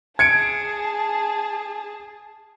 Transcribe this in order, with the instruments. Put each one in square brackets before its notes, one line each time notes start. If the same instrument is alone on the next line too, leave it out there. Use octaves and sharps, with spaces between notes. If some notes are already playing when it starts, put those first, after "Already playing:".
[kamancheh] G#4 A5 [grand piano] G#6 C#7 D7